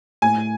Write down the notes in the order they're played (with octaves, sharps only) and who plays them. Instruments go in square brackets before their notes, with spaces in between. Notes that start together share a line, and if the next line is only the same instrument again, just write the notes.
[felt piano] A2 [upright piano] G#5